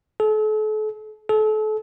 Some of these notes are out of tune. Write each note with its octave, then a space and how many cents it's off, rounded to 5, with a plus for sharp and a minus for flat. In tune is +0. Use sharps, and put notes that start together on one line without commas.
A4 -40
A4 -35